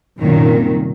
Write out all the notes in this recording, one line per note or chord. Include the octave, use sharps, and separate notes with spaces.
C2 F#2 A#2 D#3